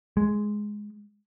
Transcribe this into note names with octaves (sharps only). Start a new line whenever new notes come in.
G#3